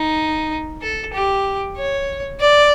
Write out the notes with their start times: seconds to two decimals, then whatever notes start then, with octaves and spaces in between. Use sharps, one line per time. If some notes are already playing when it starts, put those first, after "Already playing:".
Already playing: D#4
0.82 A4
1.13 G4
1.77 C#5
2.40 D5